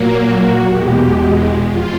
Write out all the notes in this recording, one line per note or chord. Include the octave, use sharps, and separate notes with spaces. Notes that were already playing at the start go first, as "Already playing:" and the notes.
Already playing: A#2 F#3 A#3
F#4
E2 B2 G#3 G4
F2 F4